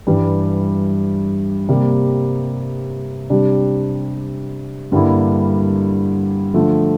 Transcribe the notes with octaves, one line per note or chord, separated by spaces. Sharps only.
G2 E3 G3
C3 G3 A#3
C3 G3 D4 G4
G2 D3 G3 A#3 E4
D3 F3 A3